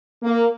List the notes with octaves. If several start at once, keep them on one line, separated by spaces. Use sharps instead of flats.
A#3